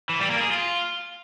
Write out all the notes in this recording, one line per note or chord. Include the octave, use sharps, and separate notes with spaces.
E3
G3
A#3
G#4
F4